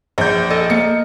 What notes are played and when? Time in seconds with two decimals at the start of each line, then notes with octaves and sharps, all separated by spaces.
0.18 A#1 G6
0.50 A4 D#5
0.70 A#3 C#7